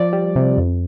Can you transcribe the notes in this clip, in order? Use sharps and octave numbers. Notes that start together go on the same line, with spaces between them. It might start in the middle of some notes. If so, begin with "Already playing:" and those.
Already playing: F3 D5
G3
C3
F2